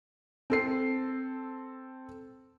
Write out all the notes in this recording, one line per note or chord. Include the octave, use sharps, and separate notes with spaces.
C4 A4 C7